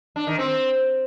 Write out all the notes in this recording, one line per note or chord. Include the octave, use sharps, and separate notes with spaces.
D4
D#3
C4